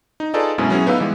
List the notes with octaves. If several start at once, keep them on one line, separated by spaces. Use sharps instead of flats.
D#4
D#4 F4 G#4 A4 B4 D5
F#2 B2 G#3 C4 C#4 E4
F#3 B3 C#4 E4 F#4 G#4
A2 B3 D#4 B4 F5 E6
E3 G3 G#3 B3